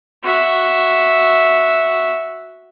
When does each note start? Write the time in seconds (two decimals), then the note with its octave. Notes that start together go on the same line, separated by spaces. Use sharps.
0.24 F#4 E5